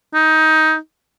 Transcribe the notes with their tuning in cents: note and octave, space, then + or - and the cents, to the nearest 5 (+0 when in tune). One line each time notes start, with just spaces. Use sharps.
D#4 +15